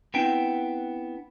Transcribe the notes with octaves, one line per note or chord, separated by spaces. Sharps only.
B3 C4 D4 E4 G5